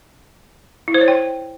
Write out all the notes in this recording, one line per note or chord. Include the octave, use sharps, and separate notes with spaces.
E4
C5
C#5
G5